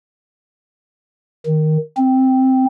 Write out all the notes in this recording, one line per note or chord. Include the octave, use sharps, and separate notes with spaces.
D#3
C4